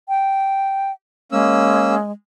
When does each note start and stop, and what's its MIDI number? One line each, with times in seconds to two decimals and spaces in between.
0.09 0.92 79
1.32 2.11 56
1.32 1.95 58
1.32 1.95 61
1.32 1.95 88